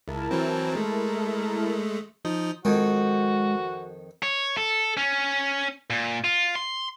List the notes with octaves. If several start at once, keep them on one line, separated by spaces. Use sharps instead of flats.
C#2 E4 A#4 A5
E3 F#3 C4
G#3 A3
F3 D#4 D#5
F2 D#3 G#3 F#4
C#5
A4
C#4
A#2
F4
C6